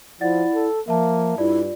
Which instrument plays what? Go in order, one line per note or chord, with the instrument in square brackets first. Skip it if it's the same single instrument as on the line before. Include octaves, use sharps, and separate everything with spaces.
[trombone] F3 [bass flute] E4 [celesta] D5 F#5 A6
[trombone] A4
[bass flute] F3 [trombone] A#3 [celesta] E5 A5
[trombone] G2 [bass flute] E4 [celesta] F4 D5